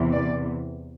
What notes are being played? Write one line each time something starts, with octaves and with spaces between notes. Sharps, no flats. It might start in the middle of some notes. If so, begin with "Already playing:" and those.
Already playing: E2 C3 E3
D5